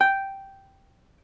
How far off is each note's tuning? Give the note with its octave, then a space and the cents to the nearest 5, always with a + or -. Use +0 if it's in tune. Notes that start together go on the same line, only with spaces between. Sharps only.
G5 -5